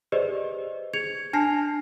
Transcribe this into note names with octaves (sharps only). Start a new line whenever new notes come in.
G4 G#4 B4 C5 D5 D#5
G#4 G#6 C#7 F7
D4 G#5 A5 F6 A#6 C7